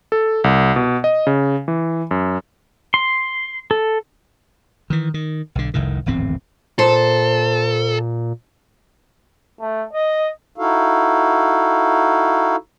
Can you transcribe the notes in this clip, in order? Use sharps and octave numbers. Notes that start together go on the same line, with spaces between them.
A4
C2
B2
D#5
C#3
E3
F#2
C6
A4
D#3 E3
D#3
B1 D3
F1 C2 A2 D#3
D1 G#1 E2 C4
A#2 A4 C5
A3
D#5
D#4 E4 F#4 A4 F5